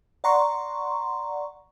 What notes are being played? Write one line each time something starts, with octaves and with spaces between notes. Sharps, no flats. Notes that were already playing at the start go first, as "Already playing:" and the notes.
D5 F#5 A#5 C6 C#6